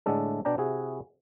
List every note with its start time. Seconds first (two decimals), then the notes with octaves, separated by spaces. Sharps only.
0.06 A2 D3 G#3 A3 D4 A4
0.45 B2 D4 D5 G5 A#5
0.58 C3 E4 F#4 G#4